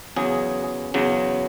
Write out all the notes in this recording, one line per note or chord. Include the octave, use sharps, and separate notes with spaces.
E2 C#3 F#3 G#4
E2 C#3 F#3